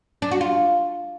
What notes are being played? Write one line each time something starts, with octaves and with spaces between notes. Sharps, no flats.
D4
F#4
F4